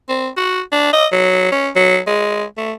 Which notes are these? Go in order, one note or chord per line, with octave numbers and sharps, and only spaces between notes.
C4
F#4
D4
D#5
F#3
C#4
F#3
G#3
A3